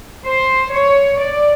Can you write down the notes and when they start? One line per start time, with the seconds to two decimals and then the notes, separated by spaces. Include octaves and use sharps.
0.24 C5
0.71 C#5
1.19 D5